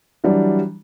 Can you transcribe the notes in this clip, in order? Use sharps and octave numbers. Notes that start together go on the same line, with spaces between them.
E3 F#3 G3 D4